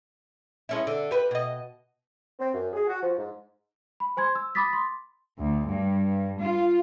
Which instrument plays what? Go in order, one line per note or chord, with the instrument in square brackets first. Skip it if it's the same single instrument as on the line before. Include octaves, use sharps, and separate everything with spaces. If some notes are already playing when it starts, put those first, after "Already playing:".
[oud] G#3 C#4 E4
D3
G4 B4
B2 D#5
[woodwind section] C4
F#2
G#4
F#4
F3
G#2
[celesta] B5
C5 G#5 C6 G#6
E6
B5 D6 D#6 A6 B6
C6
[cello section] D2
G2
F4